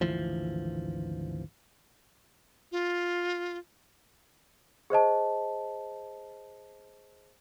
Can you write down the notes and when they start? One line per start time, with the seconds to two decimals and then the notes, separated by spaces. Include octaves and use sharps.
0.01 G#1 D2 E3 F3
2.72 F4
4.90 G#4 C5 D#5 A5